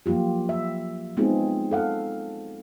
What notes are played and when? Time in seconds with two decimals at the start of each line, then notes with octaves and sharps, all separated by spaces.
0.06 F3 F#3 A#3 F4 G4
0.49 E5
1.17 G#3 B3 C4 D#4 F4 G#4
1.71 A4 F5 F#5